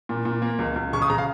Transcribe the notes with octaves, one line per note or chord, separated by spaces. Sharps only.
A#2
A#2
A#3
C#2
C#2
C#3 C#6
D#6
C#3 A#5
F5